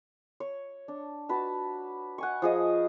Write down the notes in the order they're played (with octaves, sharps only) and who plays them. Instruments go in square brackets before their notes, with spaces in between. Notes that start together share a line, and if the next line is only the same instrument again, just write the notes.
[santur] C#5
D4
F#4 B4 A5
F#5 G#5 C#6
F3 G#4 D#5